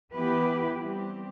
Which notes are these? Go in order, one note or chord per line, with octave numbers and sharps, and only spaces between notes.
E3 B3 E4 G4 B4
G3 C4 G4